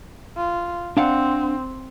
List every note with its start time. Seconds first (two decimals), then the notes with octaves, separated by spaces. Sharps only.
0.37 F4
0.97 C4 D4 F5 F#5